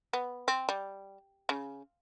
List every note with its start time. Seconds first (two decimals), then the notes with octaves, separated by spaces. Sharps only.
0.13 B3
0.48 C4
0.69 G3
1.49 C#3